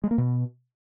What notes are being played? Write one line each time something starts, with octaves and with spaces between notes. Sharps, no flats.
G#3
A#3
B2